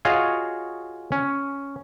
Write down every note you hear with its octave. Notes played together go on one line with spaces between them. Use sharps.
F4 F#4 G#4 C#5 D#5 F5
C#4